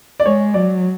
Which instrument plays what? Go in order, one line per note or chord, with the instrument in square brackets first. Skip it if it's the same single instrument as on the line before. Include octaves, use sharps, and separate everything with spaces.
[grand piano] D5
[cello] G#3 [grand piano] C#5
[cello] F#3 [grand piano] D5